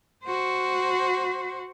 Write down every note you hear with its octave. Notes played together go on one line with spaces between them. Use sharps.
F#4 C5